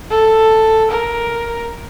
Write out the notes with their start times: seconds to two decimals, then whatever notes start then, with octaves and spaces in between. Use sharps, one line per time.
0.10 A4
0.90 A#4